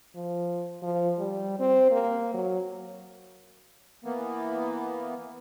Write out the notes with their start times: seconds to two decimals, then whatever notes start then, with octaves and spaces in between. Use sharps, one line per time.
0.15 F3
0.83 F3
1.19 G3
1.60 C4
1.92 A#3
2.34 F#3
4.05 E3 A#3 B3